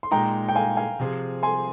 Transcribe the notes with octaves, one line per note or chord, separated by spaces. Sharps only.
C6
A#2 G#3 D#4 G5 A#5
G5
F5 G#5
F5 G#5
C3 F3 C4 F4 G#4
G#5 C6